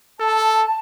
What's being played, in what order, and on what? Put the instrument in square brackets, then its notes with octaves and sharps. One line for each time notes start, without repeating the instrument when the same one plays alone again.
[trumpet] A4 [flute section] A5